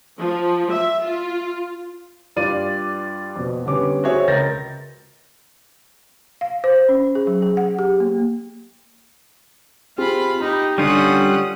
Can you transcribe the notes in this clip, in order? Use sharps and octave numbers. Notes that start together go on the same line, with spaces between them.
F3
E5
F4
G2 F4 D5 D#7
F2 B2
D3 G3 B3 C#4 D6
C4 F#4 G#4 C#5 E5
C#2 A#4 G6 A6 A#6
F5
C5
C#4
G#4
F#3
G#4
F#5
G4
A#3
C4 F4 G4 G#4 B5
D#4 G4 B5
D3 G3 C#4 F4 F#5 D#6